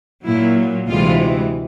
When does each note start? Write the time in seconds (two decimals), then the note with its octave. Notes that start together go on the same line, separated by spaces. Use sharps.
0.25 A#2 F#3 E4
0.88 D2 C3 E3 G#3 F4